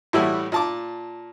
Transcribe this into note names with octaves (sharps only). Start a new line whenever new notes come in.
A2 E3 G3 A3 E4 F#4
A#2 A5 D6